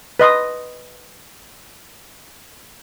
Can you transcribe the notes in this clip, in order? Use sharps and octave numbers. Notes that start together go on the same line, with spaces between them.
B4 D#5 C6 D#6